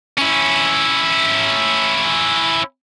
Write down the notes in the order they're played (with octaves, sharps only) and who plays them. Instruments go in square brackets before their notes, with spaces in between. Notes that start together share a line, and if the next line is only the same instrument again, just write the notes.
[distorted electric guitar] C#4 E4